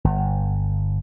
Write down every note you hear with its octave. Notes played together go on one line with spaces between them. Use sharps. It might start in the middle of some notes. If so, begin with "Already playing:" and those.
G1